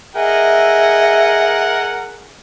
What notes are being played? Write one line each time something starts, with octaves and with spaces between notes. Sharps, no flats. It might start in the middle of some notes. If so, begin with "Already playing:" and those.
G#4 A#4 D#5 E5 F#5